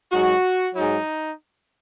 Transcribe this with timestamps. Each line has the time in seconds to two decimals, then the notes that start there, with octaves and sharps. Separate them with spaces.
0.12 G#2 F#3 F#4
0.75 G#2 F#3 D#4